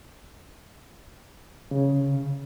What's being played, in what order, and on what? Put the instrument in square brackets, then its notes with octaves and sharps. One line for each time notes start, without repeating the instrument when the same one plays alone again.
[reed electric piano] C#3